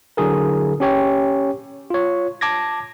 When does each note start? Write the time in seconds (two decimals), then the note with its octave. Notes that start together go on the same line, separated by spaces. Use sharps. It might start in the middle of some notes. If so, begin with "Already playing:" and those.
0.17 D3 F#3 E4 G#4 A#4
0.80 C#4 G4 C#5 G5
1.90 F4 C#5
2.41 A5 D6 G#6 A#6